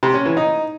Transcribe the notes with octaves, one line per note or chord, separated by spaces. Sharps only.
C3
C#4
E3
D#4